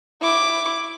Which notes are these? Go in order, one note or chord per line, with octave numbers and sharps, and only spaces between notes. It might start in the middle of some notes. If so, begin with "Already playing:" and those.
E4 D6